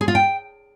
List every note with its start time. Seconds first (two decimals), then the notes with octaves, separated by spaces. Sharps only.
0.01 G#4
0.08 F4
0.15 G5